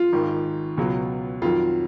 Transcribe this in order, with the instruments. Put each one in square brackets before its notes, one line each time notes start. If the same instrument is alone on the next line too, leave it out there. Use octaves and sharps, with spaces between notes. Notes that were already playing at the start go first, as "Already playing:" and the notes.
Already playing: [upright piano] F4
G#1 G#2 D#3
C#2 B2 F#3
F2 D#3 F#3 F4